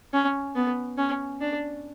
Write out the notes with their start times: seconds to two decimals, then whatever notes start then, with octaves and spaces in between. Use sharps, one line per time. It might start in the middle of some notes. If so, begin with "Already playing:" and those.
0.13 C#4
0.56 B3
0.98 C#4
1.41 D4